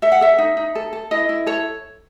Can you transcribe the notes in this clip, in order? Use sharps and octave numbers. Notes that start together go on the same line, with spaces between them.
A4 E5
F#5
A4 E5
D#4
D#4
A4
A4
E4 D#5
E4
A4 C#5